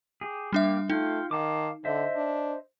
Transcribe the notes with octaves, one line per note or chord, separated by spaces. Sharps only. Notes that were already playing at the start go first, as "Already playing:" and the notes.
G4 G#4
G3 A#3 D4 G4 E5
A3 D#4 F4 G5
D#3 F5 A5 D6
D3 C5 D#5 E5
D4